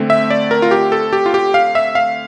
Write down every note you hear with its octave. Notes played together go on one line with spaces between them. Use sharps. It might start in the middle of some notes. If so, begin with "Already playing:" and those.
Already playing: D3 A3 C4
E5
D5
A#4
F4
G4
A4
G4
F4
G4
F5
E5
F5